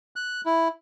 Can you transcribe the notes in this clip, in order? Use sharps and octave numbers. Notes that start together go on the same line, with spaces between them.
F#6
E4